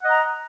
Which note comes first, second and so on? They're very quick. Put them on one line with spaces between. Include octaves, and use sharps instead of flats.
F#5 D#5 A#5